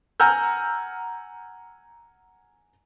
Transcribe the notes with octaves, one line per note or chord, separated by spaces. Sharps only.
F#5 G#5 A#5 E6 F6 G6